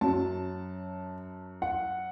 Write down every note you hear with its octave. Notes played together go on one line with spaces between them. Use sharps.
F#2 F#3 A5
F#5